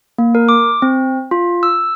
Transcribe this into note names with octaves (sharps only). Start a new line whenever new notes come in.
A#3
A#4
D6
C4
F4
E6